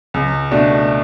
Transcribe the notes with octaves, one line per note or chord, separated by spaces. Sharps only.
C#2
B2 A3 D4 F#4